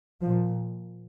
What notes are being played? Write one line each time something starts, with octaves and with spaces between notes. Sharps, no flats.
A#2 F3